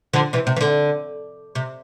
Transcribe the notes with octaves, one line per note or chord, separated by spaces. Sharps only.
D3 F3
C3 E3
C3
E3
D3
C3